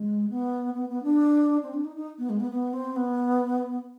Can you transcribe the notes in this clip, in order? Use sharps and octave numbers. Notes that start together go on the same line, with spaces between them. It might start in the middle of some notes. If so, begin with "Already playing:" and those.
Already playing: G#3
B3
B3
B3
D4
C4
D4
D#4
D#4
B3
G#3
B3
B3
C4
B3